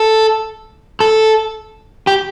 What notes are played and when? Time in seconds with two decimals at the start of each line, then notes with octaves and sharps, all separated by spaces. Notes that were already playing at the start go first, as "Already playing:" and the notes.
Already playing: A4
1.00 A4
2.07 G4